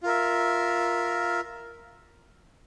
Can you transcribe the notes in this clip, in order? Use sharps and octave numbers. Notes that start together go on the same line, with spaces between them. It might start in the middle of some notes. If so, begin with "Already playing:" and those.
F4 A#4 E5